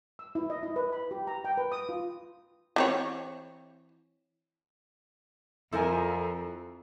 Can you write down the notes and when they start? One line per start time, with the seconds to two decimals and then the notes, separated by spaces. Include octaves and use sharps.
0.19 E6
0.35 E4
0.50 D#5
0.63 E4
0.76 B4
0.92 B5
1.11 G4
1.27 A#5
1.44 G5
1.57 B4
1.72 D#6
1.89 F4
2.76 E3 C4 C#5
5.72 F2 F3 E4 A4 A#4 G#5